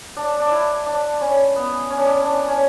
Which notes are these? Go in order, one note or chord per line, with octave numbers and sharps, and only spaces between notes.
D4
D4
E4
D4
C#4
B3
C#4
D4
C#4
D4
C#4